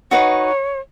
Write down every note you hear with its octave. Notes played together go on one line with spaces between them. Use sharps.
D#4 F#4 B4 C#5 D#5